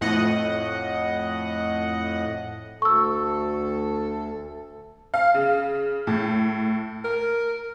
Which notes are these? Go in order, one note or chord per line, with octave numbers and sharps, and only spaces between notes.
F2 A2 D#5 F#5
D2 A4 C#6 E6
F5
C#3
A2
A#4